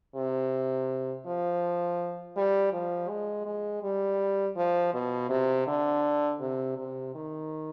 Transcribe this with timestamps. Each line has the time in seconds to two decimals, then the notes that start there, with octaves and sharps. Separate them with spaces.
0.15 C3
1.26 F3
2.36 G3
2.73 F3
3.09 G#3
3.46 G#3
3.83 G3
4.57 F3
4.94 B2
5.30 C3
5.67 D3
6.40 C3
6.77 C3
7.15 D#3